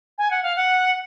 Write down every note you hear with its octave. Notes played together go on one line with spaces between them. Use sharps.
G#5
F#5
F5
F#5